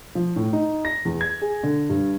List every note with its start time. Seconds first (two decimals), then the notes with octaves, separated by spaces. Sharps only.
0.15 F3
0.36 A2
0.53 D#4
0.85 A#6
1.05 E2
1.21 G#6
1.42 G#4
1.63 D3
1.90 G2